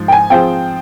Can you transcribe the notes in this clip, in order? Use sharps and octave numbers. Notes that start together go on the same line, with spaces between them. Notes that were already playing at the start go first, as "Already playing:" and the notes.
Already playing: G#2 F3
G5
G#5
F3 C4 F4 G#4 C5 G5